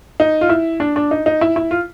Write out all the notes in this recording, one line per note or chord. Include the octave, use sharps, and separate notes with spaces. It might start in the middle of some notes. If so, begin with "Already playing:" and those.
D#4
F4
E4
D4
D4
D#4
D#4
E4
E4
F4